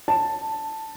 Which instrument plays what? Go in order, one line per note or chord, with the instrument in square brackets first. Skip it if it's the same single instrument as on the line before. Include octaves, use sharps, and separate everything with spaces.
[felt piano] A5